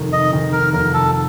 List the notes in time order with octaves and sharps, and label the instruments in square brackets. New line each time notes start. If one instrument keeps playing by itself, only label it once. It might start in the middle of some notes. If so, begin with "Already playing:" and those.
Already playing: [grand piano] F1 D#3
[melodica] D#5
[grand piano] D#3
[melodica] A#4
[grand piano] F1 [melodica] A#4
[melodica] A4